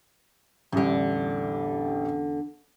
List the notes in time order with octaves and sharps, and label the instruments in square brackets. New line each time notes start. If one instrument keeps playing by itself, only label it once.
[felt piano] A1 G3 [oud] E2 D3